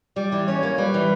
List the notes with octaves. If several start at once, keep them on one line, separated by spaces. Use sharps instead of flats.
G3 D5
E3
C#4 C#5
A#3
G3 B4
E3